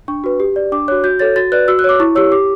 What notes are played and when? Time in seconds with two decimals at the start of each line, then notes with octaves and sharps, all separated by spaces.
0.08 D4 C#6
0.24 F#4 B4
0.40 G4
0.56 D5
0.72 D4 D6
0.88 C#5 F#6
0.92 F#4
1.04 F#4 G6
1.19 A4 C#5 A6
1.36 F#4 A6
1.52 B4 D5 F#6
1.68 F#4 E6
1.79 F#6
1.84 C#5 D6
2.00 E4 C#6
2.16 G4 C#5 E6
2.32 G4 D6